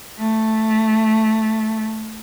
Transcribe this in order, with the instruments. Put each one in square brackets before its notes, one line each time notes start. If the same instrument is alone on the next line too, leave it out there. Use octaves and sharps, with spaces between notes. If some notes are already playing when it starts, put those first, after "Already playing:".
[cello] A3